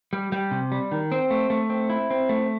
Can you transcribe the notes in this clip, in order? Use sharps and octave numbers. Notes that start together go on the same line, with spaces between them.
G3
G3
C3
G3
D#3
C4
A3
A3
C4
E4
C4
A3